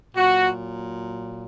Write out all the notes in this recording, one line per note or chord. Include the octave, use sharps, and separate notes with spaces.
A#2 F#3 F#4